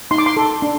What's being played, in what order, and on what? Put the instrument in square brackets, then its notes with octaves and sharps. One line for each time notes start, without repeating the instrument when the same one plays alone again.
[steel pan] D#4 C6
D6
C6
A4
D4